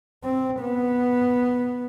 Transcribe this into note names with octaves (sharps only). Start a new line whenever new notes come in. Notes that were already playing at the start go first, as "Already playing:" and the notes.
C4
B3